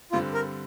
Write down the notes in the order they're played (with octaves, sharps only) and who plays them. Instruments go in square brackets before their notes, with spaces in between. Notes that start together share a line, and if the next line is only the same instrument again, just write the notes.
[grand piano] G2 D3 G3 C4 [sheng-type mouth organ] F4
[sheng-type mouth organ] A#4